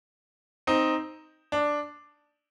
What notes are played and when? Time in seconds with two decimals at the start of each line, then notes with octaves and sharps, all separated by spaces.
0.67 C4 D#4
1.52 D4